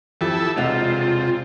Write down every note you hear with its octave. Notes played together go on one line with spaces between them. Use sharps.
F2 E4 G4 A4
E1 C3 F4 D#5 F#5